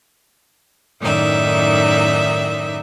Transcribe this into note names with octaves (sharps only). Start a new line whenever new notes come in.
F#2 A2 D#3 D#4 D5 E5